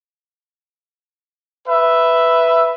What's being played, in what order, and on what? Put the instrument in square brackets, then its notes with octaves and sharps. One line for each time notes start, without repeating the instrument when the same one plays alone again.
[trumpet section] B4 E5